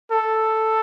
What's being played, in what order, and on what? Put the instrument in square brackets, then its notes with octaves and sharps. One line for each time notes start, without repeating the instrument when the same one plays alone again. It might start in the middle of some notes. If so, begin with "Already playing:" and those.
[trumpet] A4